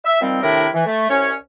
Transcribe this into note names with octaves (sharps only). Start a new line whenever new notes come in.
E5
D#3 F3 G3 C4
A2 C3 D#3 D4 E4 A#4
E3
A3
C2 C#4 C#5